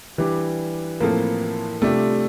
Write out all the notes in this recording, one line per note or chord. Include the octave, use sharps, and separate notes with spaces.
E3 G3 D4 G4
A2 F3 A#3 C4 F4 A4
C3 G3 A3 D4 F4